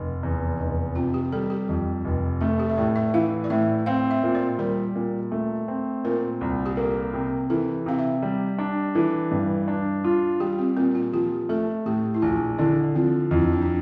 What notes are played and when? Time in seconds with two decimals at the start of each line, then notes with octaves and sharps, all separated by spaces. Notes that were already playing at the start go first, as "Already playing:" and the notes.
Already playing: F1
0.23 E2
0.60 F1
0.96 C3 F4
1.14 G4
1.32 G3 A4
1.50 G4
1.69 F2
2.05 F1
2.41 A3 A4
2.60 G4
2.69 E5
2.77 A2 D5
2.96 E5
3.14 E3 F5
3.44 D5
3.50 A2 E5
3.86 C4 F5
4.11 E5
4.23 A#2
4.35 D5
4.59 G3 A#4
4.95 A#2
5.32 A3
5.68 C4
6.04 A#2 A#4
6.41 C2
6.66 G4
6.77 A#3 A4
7.14 C3
7.50 E3 A4
7.86 C3 F5
7.98 E5
8.22 G3
8.58 D4
8.95 E3 A4
9.32 G2
9.68 D4
10.04 F4
10.40 G3 G4
10.59 C4
10.77 A#2 C4
10.95 F4
11.13 F3 G4
11.49 A3 A4
11.86 A2 G4
12.14 E4
12.22 A#1 F4
12.58 D3 E4
12.95 F3 C4
13.31 F2 E4
13.42 D4
13.53 C4
13.62 D4